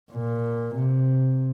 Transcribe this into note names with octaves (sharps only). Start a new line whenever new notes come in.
A#2
C3